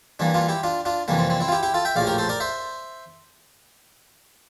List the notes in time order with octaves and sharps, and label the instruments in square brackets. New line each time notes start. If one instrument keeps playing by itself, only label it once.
[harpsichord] G2 E3 G3 A#3 D4
D4 F4
E4 G4
D4 F4
D4 F4
F2 C3 E3 G3 A#3 D4
C4
C4
C4 E4
F4
E4 G4
E4 G4
F4 A4
E5 G5
A#1 A2 F3 D5 F5
G4 A#4
A4 C5
A#4 D5
C5 E5